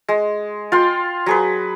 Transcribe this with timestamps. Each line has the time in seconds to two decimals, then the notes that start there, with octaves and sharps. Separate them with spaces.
0.08 G#3
0.72 F4 G5 C6
1.26 F#3 G#4 B4